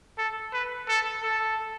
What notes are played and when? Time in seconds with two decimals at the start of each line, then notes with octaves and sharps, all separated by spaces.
0.18 A4
0.53 B4
0.88 A4
1.23 A4